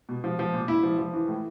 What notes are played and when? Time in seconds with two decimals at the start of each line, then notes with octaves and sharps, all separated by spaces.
0.09 B2
0.24 F3
0.39 F3
0.54 A#2
0.68 A#2 E4
0.83 F3
0.98 F3
1.14 E3
1.28 A2